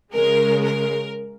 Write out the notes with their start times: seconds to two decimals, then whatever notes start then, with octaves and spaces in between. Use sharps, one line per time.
0.13 C#3 G#3 A#4
0.63 A#4